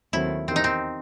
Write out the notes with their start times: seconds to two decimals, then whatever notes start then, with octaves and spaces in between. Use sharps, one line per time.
0.13 D#2 D#3 F#3 A3 C4 E4
0.47 E2 C3 D#3 C4
0.56 D#4
0.64 C4